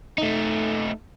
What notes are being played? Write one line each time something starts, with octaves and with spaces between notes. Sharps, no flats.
A3 D#4